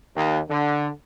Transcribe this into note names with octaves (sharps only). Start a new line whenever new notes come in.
D#2
D3